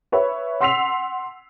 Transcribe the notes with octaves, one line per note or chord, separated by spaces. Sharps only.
B4 C#5 E5
F#5 C6 E6 B6 C7 F7